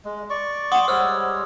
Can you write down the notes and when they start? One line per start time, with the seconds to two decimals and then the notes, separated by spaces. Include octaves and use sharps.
0.05 G#3
0.30 D5 C#6
0.72 F#5 C6 D6 D#6
0.88 G3 G#3 C5 C#5 E6 F6